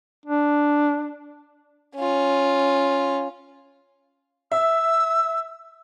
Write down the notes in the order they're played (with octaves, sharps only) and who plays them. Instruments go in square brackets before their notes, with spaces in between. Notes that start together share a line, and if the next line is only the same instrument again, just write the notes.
[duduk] D4
[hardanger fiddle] C#4 F4
[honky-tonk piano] E5 [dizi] E6